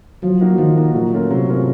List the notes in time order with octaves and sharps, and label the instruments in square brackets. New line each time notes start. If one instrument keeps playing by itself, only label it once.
[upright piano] F3 [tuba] F#3
[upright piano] A#3 D#4 F#4 A#4
[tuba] D#3 [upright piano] F3
[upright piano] A#3 D#4 F#4 A#4
[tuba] A#2 [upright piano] F#3
[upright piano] A3 C#4 F4 A#4
[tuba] C3 [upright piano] F#3
[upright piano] A3 C#4 F4 A#4